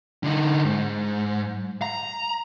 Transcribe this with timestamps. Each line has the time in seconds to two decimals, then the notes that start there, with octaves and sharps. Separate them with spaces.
0.23 D3 D#4
0.65 G#2
1.82 A#5